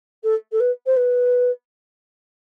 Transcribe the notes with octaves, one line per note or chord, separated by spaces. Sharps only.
A4
A4
B4
C5
B4